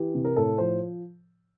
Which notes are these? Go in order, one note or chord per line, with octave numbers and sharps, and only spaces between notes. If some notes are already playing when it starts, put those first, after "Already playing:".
Already playing: E3 G4
C3
A#4
A2 A4
F3 C5